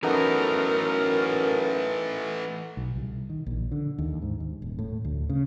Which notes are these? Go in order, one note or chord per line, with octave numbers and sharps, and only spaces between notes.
F#2 E3 A3 B3 D#4 A4 A#4
B1
C2
D#3
A#1
D3
D#2
G#2
D#2
D#1
A2
D2
C#3